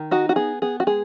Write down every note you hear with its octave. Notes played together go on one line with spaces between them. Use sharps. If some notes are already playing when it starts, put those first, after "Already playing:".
Already playing: D#3
D#4 F#4
F#4
B3 G#4
B3 G#4
F#4
G#3 G#4